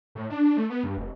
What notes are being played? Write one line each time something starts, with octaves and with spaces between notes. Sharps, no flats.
A2
D4
D4
A3
B3
G2
F1